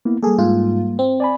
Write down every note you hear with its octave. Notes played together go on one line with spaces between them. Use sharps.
A#3 B3 E4
G3 A#3 G#4 A4
G#2 F4
C4
D5 G#5 B5